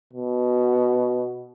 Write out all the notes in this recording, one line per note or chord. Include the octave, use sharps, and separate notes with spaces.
B2